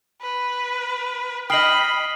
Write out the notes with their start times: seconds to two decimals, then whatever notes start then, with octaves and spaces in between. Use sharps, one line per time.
0.22 B4
1.50 D#5 G5 B5 D#6 F6 C7 D#7 F#7